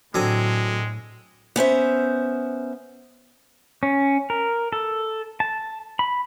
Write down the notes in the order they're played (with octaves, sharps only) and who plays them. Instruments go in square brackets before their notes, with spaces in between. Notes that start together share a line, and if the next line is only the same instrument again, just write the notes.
[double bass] A2 [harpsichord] D3 C4 G#5 [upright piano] F#3 [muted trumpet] G#3
[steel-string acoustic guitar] B3 C#4 C5 E5
[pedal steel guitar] C#4
A#4
A4
A5
B5